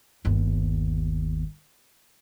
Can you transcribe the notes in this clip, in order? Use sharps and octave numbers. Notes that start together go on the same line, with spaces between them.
G1 D#2